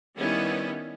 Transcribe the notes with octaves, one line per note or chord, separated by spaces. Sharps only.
D#3 G3 B3 C#4 E4